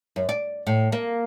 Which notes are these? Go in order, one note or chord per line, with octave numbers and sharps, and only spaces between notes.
F#2
D5
A2
A#3